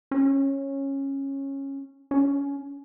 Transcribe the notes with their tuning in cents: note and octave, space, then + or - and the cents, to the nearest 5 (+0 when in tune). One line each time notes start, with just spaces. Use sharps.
C#4 -15
C#4 +20